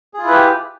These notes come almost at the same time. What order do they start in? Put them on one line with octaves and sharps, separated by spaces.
G#4 F4 E4 B4 G4